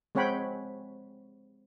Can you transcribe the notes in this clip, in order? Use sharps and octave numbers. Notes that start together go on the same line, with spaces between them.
G#3 C4 C#5 F#5 G5 B5